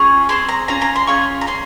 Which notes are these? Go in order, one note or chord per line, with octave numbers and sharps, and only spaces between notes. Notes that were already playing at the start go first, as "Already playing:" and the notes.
Already playing: C#4 F4 G#4 C#6
C4 E4 G#4 C6
A#5
C#4 F4 G#4 A#5
A#5
C6
C#4 F4 G#4 C#6
A#5
C#4 C6